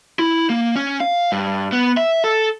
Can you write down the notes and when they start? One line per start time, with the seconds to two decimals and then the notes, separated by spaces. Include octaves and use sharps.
0.19 E4
0.50 A#3
0.76 C#4
1.00 F5
1.32 G2
1.72 B3
1.97 E5
2.24 A4